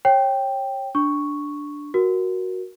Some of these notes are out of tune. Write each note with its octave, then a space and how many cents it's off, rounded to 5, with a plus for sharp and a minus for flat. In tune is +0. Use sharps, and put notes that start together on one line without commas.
C#5 -25 G5 +0
D4 +0 C#6 +0
F#4 +0 A#4 +10